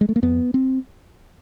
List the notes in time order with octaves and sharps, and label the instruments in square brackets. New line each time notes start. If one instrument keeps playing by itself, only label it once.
[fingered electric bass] G#3
A3
A#3
F2 B3
C4